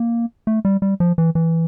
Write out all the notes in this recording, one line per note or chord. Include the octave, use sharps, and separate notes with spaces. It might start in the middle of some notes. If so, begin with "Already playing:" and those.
Already playing: A#3
A3
G3
G3
F3
E3
E3